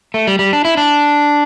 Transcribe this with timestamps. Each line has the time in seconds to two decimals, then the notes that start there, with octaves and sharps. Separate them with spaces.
0.14 A3
0.27 G3
0.39 G3
0.53 D4
0.65 E4
0.77 D4